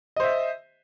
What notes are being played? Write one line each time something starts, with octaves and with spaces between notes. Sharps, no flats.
C5 D#5 E5